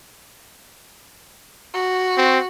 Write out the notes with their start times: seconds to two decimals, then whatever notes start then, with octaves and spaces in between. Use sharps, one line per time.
1.74 F#4
2.17 C4